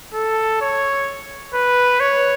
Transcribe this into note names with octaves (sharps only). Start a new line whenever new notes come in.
A4
C#5
B4
C#5